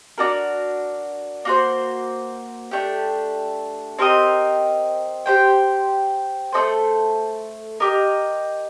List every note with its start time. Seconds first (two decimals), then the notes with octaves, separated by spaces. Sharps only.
0.18 D4 F#4 A#4
1.45 A#3 F#4 C5
2.71 A3 D4 G4
3.99 C4 G4 A#4 D#5
5.26 G4 C5 G5
6.53 A3 D#4 A4 C5
7.80 G4 A#4 D#5